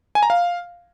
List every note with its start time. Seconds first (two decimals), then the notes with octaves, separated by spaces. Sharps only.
0.15 G#5
0.23 A#5
0.30 F5